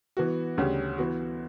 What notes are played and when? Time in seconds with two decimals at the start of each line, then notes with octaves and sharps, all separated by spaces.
0.17 E3 B3 F#4
0.58 D2 C#3 G3 C#4
0.98 E3 B3 F#4